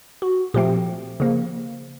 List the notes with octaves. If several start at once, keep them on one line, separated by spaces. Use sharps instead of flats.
F#4
A#2 F3 A3 C4 G4
C#3 F3 A#3